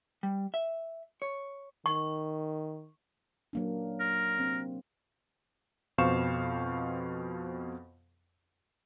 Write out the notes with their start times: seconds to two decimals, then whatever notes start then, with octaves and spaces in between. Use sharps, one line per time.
0.23 G3
0.54 E5
1.22 C#5
1.86 D#3 C#6
3.53 F#3 A#3 D4
4.00 A#4
4.39 C4
5.98 F2 B2 C5 F5 C#6 E7